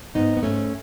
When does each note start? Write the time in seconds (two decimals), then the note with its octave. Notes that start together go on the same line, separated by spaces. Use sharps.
0.15 G#2 B3 D#4
0.37 B3
0.43 G#2 A3 C#4